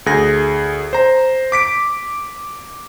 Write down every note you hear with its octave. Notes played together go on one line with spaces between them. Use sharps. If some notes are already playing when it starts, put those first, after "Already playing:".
D2 G#4 A#6
C5 A#5
D6 B6 D7